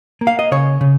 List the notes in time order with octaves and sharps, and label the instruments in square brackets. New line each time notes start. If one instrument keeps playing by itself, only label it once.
[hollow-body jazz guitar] A#3
F5
D#5
C#3 C#5
C#3